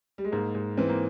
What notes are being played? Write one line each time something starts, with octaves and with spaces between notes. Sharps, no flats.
G3
G#3
G#2 A#3
G#2
E3 C4
A#3